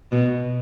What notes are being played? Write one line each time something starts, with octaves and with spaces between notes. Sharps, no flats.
B2